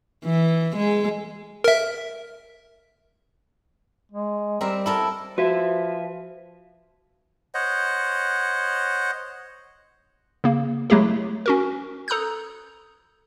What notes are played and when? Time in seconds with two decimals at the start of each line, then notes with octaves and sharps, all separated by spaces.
0.24 E3
0.76 G#3
1.64 A#4 E5
4.12 G#3
4.61 G3 C4 A#4 E5
4.86 E4 A4 A#4
5.38 F3 F#4 B4 E5
7.54 C5 C#5 D#5 F#5
10.44 C#3 A#3
10.90 F#3 G#3 A3 E4 G4 G#4
11.46 C#4 F#4 A#4
12.08 A4 A#5 D#6 F#6 G6